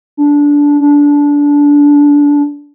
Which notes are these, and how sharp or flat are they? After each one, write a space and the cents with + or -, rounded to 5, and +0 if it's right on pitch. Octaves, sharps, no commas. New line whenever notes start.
D4 -15
D4 -20